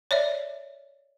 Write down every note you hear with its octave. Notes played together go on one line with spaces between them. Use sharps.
C#5 D5 E5